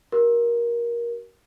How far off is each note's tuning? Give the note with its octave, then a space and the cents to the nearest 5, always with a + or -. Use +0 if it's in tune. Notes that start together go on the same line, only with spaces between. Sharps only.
F#4 +40 A#4 +20